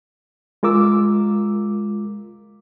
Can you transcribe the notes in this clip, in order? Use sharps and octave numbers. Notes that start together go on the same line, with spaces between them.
G#3 F4 A#4 D6 E6